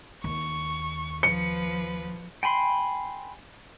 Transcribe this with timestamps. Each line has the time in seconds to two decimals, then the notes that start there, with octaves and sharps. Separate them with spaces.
0.24 D#2 C#6
1.23 F3 B4 C#7
2.43 G5 G#5 B5 C6